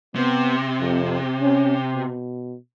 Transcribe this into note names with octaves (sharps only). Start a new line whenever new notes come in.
C3 B3
F2
C#4
B2